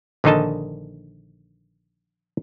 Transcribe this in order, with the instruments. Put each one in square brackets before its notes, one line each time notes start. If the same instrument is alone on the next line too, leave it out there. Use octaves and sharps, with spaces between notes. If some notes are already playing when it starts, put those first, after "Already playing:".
[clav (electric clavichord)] A#1 D3 D#3 D#4 D#5 A5